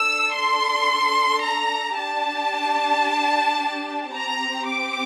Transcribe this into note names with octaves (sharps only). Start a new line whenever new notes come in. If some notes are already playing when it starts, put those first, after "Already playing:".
Already playing: D4 A4 E6
C6
A#5
D4 G4 A5
C4 G4 A#5
D6